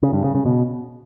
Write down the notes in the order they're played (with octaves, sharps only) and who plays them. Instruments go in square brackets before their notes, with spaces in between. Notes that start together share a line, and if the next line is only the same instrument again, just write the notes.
[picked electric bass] C#3
G2
C#3
C#3
B2